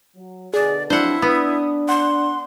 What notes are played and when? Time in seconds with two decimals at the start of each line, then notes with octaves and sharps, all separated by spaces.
0.16 F#3
0.54 B2 D3 G#4 D5
0.90 F2 F#3 D4 E4 C5 F#5
1.22 B3 D4 D#6
1.89 F#5 C6